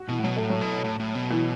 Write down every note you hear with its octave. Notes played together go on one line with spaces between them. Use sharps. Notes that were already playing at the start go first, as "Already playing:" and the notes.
Already playing: F#4
B2 E3
A2
B2 F#3
A2 A3
F#3
B2
A2
A2
B2
E3